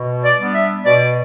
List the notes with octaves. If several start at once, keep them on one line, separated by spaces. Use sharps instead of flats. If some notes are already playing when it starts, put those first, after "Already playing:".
Already playing: B2
D5
G3 B3 D4
E5
B2 D5